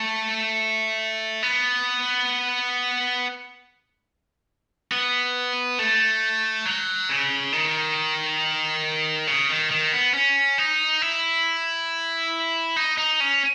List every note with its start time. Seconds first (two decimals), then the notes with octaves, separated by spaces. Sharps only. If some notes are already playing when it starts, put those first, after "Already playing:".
Already playing: A3
1.43 B3
4.92 B3
5.79 A3
6.65 F#3
7.09 C#3
7.52 D#3
9.27 C#3
9.50 D#3
9.71 D#3
9.93 B3
10.14 C#4
10.58 D#4
11.02 E4
12.76 D#4
12.98 D#4
13.20 C#4